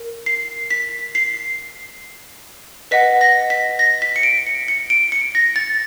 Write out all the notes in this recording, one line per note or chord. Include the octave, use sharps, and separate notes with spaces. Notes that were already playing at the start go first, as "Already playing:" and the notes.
Already playing: A#4
C7
B6
C7
B4 D#5 F#5 B6
A#6
B6
A#6
B6
C#7
D7
C#7
C#7
D7
C#7
A#6
A6